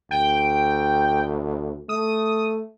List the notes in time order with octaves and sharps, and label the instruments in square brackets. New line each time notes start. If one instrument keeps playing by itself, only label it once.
[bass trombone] D2 [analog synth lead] G5
[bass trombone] A3 [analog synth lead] D#6